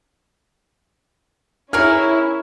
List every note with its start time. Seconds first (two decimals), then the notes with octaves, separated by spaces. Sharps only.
1.73 C#4 E4 G#4 A#4 C#5 F6